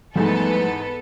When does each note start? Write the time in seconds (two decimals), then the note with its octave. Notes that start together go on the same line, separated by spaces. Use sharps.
0.15 E2 G#2 F3 G3 A3 B3 A4 G#5